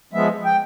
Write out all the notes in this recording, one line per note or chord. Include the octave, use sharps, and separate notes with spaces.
F3 G#3 B3 E5
G5